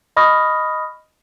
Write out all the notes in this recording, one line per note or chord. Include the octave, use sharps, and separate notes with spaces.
D#5 B5 C#6 D#6 F6 A#6